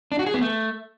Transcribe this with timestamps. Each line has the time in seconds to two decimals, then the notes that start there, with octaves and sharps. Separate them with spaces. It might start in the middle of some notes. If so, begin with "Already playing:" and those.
0.12 D4
0.19 F#4
0.27 G#4
0.34 B3
0.41 A3